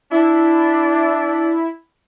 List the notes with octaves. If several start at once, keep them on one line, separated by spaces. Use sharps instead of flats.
D4 E4